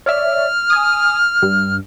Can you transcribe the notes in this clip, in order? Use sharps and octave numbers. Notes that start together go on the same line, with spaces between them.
C#5 D5 E5 F6
G#5 D#6
G2